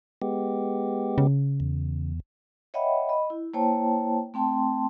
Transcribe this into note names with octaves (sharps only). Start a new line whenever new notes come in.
G#3 B3 G4
C#3
E2
C#5 D#5 E5 F#5 G5 B5
D#5 B5
E4
A#3 E4 C5 C#5 G5 A5
A3 C4 G5 A5 C6